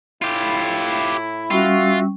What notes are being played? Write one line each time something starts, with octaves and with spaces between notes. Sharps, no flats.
A2 E4 F4 G4
G3 C#4 F4 F#4 E5 E6